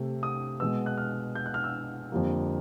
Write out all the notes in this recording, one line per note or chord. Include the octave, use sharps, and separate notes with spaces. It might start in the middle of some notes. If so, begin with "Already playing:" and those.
Already playing: C3 A3
D#6
B2 G#3 B3 E6
F#6
F6
G6
F#6
F6
E6
F2 D3 G3 A#3